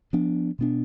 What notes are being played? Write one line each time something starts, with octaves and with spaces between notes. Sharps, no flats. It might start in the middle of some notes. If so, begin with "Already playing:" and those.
F3 B3 D4
B2 B3 D4